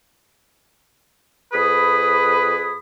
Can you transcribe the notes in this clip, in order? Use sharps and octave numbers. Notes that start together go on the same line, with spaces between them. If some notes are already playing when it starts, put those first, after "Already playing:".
F2 G#4 B4 B5 D#6